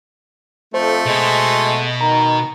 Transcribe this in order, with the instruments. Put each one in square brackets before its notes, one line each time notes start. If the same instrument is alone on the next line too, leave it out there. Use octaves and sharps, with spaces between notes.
[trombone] F2 [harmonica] A3 [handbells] C5
[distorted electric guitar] B2 [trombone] G#3
[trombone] D#3 [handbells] A#5